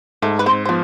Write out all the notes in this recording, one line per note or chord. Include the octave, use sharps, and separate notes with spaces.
G#2 A3 A4
B4
C4 C5
C5
F3 B3